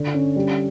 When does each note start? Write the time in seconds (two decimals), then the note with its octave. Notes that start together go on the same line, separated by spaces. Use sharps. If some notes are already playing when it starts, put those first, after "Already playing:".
Already playing: D3
0.14 C#4
0.36 G3